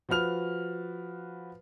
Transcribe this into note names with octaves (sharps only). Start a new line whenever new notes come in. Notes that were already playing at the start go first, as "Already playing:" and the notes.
F3 F#4 B4 F6 F7